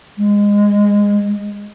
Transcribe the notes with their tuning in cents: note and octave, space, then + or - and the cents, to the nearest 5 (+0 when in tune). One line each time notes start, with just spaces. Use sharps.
G#3 -20